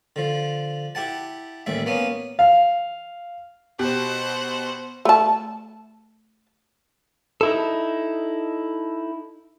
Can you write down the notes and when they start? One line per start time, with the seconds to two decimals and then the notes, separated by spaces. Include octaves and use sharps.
0.16 D3 F3
0.95 E4 G4 F#5 A5
1.66 A1 D#2 G3 E5
1.86 A#3 B3 C#4
2.39 F5
3.79 B2 G4 C5 F#5
5.05 A3 A5
7.41 D#4 E4 A4